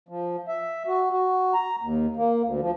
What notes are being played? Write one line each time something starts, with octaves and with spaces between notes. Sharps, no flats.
F3
E5
F#4
F#4
A#5
D#2
A#3
D2
F3